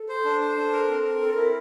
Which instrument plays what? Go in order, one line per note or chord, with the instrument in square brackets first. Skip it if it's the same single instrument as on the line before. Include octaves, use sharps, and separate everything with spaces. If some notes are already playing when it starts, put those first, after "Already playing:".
Already playing: [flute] A4
[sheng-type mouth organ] C5
D4
C5
D4
A#4
C4
A#4
[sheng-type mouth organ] C4 [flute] A4
[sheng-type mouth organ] E4 [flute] A#4